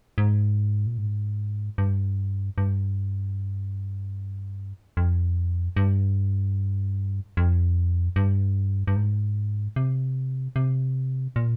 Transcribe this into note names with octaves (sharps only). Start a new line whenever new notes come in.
G#2
A#2
G#2
G2
G2
F2
G2
F2
G2
G2
G#2
C3
C3
A#2